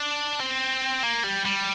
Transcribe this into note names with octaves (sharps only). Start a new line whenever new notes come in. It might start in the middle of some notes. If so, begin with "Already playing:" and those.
Already playing: D4
C4
A#3
G3
G3